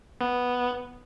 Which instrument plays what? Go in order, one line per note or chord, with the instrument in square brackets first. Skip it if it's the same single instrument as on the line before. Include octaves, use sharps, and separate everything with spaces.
[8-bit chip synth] B3